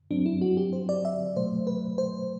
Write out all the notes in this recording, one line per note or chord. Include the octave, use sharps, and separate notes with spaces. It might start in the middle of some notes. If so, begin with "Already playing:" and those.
G2 F#3 C4 D4
E4
F#4
G4
C5
D5
E5
B2 F#3 A3 C5
B4
C5